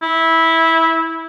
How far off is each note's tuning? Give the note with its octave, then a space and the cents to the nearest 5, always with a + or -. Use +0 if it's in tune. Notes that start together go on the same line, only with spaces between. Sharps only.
E4 -15